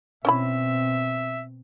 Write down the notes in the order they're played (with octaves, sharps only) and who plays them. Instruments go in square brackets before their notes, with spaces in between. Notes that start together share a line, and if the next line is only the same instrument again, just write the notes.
[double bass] B2 C4 [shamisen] C#4 E4 B5 [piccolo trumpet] E5